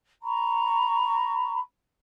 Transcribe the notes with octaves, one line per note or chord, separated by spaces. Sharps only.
A#5 B5 C#6